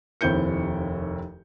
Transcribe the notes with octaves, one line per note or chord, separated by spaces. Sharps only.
F1 D#2 C4 E4 G6 C#7